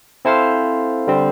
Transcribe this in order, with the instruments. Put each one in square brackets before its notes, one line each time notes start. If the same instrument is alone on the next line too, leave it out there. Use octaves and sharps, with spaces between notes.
[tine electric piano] C4 E4 A4 C5 F5
D3 G3 C4